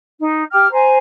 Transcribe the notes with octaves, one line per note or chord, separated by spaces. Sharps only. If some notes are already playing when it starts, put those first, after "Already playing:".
D#4
G4 G5 D6 F6
C5 G#5 A#5